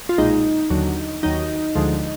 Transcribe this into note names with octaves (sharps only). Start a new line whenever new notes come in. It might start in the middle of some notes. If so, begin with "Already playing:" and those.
F4
B1 A#2 G#3 D#4
D#2 D3 F#3
D#2 D#3 F#3 D#4
D2 D3 F3 G#3